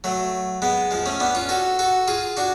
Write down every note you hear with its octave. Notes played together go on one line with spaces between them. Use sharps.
F#3 A3
G#3 B3
F3 G#3
A3 C#4
B3 D4
C#4 F4
F#4 A4
F#4 A4
F4 G#4
D4 F#4